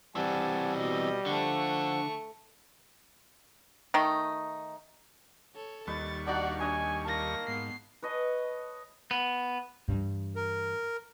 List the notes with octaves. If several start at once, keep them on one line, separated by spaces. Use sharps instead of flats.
E3 G3 C4 F#5 G#5 A5
B2 D#5
D3 F3 A3 F#5 C#6
D#3 A3 D#4
A4 C#5
D#2 G3 D#4 B4 D#5 C#6 A6
D4 D#4 F#4 D5 F5 F#5
D4 C#5 D#5 G5 G#5
A#3 D#5 A5 A#6
G#2 B3 C7
B4 C#5 D#5 A5
B3
G2 E3
A#4